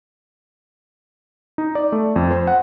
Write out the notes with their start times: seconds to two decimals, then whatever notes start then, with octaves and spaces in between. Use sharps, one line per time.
1.58 D#4
1.75 D5
1.92 A3
2.16 F2
2.31 C5
2.47 F#5